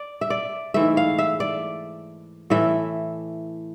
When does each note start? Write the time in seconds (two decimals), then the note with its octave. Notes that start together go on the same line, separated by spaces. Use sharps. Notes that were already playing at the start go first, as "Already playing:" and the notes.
Already playing: D5
0.21 E5
0.30 D5
0.74 G#2 E3 A3 E5
0.97 F5
1.19 E5
1.40 D5
2.50 A2 E3 A3 E5